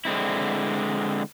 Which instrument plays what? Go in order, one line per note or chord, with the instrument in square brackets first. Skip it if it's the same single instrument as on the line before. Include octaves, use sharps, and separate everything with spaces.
[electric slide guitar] D3 G#3 C4 E4